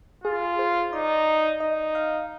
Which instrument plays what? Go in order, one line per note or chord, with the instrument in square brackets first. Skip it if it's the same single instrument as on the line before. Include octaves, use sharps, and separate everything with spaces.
[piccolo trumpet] F4 [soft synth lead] G#4
[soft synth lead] C5
[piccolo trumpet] D#4 [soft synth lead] D5
[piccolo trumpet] D#4 [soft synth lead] D#5
[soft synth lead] F5